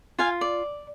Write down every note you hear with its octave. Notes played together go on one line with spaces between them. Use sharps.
F4 F5 G#5
D5